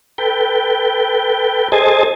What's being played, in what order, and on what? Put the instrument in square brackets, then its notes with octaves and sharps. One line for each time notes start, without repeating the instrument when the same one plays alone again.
[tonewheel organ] A4 B4 G5
G#4 A4 C5 D#5 G#5 A5